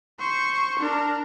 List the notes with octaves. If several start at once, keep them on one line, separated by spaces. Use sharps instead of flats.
C5 C#6
D4 A#4